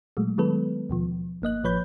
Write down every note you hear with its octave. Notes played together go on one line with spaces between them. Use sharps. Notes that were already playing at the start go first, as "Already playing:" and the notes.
A#2 F#3 G#3 A3
D#3 F#3 G#3 B3 A4 B4
D#2 B2 F3
G1 A#3 D#5 F#6
A1 F3 B4 C#5 B5 G6